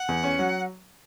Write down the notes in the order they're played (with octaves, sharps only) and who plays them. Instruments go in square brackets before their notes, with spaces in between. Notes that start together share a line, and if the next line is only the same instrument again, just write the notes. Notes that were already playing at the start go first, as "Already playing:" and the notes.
Already playing: [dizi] F#5
[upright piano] E2
C#4
F#3